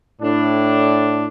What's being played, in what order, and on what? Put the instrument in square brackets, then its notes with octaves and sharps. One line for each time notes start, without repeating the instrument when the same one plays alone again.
[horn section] A2 D4